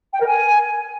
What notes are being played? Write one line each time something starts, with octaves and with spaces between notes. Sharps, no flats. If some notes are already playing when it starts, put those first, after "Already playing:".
G5
A#4
G#5